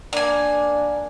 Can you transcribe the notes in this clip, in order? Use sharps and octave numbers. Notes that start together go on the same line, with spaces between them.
A#3 D4 G#5